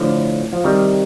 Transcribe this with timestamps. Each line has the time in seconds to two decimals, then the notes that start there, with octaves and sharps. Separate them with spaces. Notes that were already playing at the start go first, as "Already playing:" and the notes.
Already playing: A2 D3 F3
0.53 F3
0.64 C3 D#3 G3